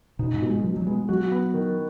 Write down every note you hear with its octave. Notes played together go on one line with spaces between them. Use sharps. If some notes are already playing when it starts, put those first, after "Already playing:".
B2 D#4
G#2
B2
G#3
B2 F#3
F#3
G#3 B3
F#3 F#4
B3
D#3